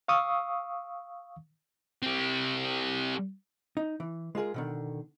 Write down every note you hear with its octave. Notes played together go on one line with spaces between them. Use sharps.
F5 C#6 D#6 E6
G3 C4
D#4
E3
G#3 F4 G#4 A#4
B2 D3 D#3